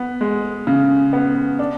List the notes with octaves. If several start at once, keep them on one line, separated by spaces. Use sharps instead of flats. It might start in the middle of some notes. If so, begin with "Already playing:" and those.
Already playing: B3
G#3
C#3
B3
D4